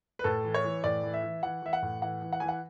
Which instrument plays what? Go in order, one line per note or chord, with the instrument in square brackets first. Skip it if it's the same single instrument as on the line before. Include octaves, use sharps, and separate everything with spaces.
[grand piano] B4
A2 A4
E3
C#5
E3
A2 D5
E3
E5
E3
E3 F#5
E3 E5
F#5
A2
E3 F#5
E3
F#5
E3 G#5
F#5